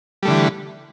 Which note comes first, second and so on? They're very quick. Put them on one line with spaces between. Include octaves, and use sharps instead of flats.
G3 A3 D3 E3